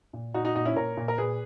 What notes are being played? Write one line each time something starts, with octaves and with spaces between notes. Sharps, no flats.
A#2
A#2 D#4 F#4
D#4 F#4
A#2 D#4 F#4
C#4 E4
A#2 A#4 C#5
A#2
A#4
A#2 G#4 B4